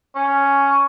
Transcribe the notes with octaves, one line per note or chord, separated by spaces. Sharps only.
C#4